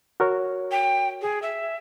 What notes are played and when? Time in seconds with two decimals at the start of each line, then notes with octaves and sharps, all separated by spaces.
0.20 F#4 A#4 C#5
0.71 G5
1.22 G#4
1.42 E5